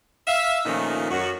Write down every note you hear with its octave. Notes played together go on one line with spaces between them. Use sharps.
E5 F5
A#2 D#3 F3 A3 C#4 D#4
F#2 F#4